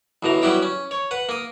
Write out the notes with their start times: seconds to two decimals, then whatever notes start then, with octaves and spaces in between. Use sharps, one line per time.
0.23 A1 B2 E3 A#5
0.42 F#3 G3 B3 E4 G4
0.62 C#4
0.91 C#5
1.11 B4 F#5
1.29 A#3 D#6